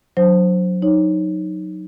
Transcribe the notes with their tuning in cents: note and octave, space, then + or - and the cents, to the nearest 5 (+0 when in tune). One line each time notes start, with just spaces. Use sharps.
F#3 -15 D4 +0 C5 +0
D#4 +0 C#5 +0